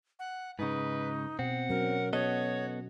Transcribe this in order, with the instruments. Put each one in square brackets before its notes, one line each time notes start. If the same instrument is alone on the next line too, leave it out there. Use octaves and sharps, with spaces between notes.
[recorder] F#5
[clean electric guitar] G#2 C#3 [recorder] D#4 [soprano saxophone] B4
[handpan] B2 [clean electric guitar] C4 [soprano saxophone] F#5
[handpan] F#3 C#4 [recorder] A#4
[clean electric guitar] B3 A4 D#5 [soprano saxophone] F#4 [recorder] C#5